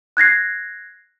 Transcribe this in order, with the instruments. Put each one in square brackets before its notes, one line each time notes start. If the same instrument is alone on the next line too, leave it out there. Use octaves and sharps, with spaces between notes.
[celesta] F#6 G#6 A#6 C7